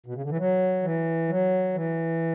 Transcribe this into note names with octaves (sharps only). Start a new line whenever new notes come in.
B2
C#3
D3
E3
F#3
E3
F#3
E3